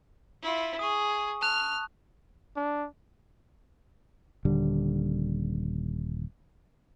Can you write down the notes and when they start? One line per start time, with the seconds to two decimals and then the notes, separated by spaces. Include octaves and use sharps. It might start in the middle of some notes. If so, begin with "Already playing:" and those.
0.42 E4 F4
0.79 G#4 C#6 D#6
1.42 A5 F6 F#6 F7
2.57 D4
4.45 D#1 D3 G3